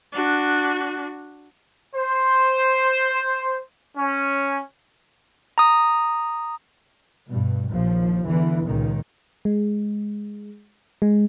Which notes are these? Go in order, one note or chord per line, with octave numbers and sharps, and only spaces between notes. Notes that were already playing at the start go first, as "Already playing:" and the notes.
D4 F#4
C5
C#4
A#5 D#6
G2 B2
A#1 D#2 F3
E2 D3 E3
C#2 A#2 D#3
G#3
G#3